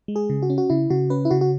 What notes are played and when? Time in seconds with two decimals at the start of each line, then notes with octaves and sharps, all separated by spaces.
0.08 G#3
0.16 G#4
0.30 C#3
0.42 F#4
0.50 C#4
0.58 F#4
0.70 C#3 E4
0.90 C#3 F#4
1.10 C#4 B4
1.25 E4
1.31 C#3 F#4
1.41 F#4